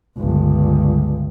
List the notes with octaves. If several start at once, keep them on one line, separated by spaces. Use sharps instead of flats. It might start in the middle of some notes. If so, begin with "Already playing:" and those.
G1 C#2